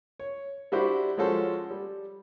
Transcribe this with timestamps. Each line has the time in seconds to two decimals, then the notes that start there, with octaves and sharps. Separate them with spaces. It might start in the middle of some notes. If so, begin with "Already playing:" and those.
0.19 C#5
0.72 G3 D4 E4 F#4 G4 C5
1.17 F3 G#3 C#4 F#4 A4 C5
1.71 G3